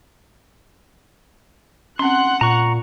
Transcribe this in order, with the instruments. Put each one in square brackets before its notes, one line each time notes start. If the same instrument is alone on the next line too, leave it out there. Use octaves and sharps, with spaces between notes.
[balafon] C4 C#4 [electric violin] F#5 F#6 [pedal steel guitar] C6
[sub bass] A#2 [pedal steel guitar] A#5 C#6